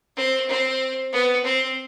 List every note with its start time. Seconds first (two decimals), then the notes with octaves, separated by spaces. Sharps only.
0.17 C4
0.48 C4
1.13 B3
1.44 C4